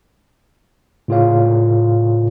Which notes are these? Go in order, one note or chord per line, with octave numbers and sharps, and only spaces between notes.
A2 C#3 F4 G#4 C#5 F5